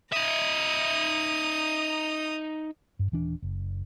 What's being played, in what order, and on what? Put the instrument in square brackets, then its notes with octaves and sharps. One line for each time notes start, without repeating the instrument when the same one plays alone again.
[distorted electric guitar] D#4 E5 [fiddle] A#5 D#6
[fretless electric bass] G2
D#1 E3 D4
F#1